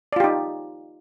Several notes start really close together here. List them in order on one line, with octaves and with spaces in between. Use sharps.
D5 F4 G4 D#4